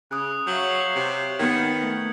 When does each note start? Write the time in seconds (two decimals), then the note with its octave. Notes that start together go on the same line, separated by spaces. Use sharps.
0.11 C#3 D#6 F#6
0.47 F#3 C#5 E5 F5 G6 F#7
0.95 C3
1.39 D#3 B3 G#6 C#7
1.79 A3